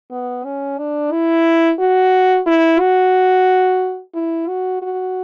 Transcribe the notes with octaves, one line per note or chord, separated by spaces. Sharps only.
B3
C#4
D4
E4
F#4
E4
F#4
E4
F#4
F#4